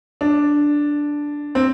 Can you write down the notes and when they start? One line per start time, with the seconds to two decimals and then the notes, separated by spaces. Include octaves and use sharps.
0.21 D4
1.55 C4